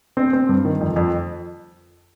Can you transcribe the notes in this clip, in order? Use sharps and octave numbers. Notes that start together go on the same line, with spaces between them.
C4
C4
G2
D#3
F2
F2